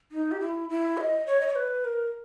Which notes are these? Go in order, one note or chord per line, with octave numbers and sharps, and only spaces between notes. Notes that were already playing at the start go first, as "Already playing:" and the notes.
D#4
G4
E4
E4
E5
D#5
C#5
D#5
C#5
B4
A#4